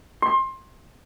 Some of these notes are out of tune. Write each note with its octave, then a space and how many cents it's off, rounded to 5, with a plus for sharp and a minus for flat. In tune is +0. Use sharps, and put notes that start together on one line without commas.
C6 +25